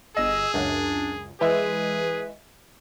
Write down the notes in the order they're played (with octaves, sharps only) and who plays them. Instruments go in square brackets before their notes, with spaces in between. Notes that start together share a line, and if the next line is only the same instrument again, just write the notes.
[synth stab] G1 D#5 [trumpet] G#4 [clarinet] E6
[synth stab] C#2 F#2 [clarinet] D4
[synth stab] E3 G#3 E5 [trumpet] G#4 [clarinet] B4